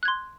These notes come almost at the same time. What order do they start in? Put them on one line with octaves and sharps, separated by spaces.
F#6 G#6 C6